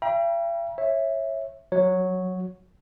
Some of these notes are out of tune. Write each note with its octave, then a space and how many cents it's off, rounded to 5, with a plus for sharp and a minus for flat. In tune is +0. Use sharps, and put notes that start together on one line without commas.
E5 +45 G5 +10 A#5 +40
C#5 -20 E5 +0
F#3 -5 C#5 +0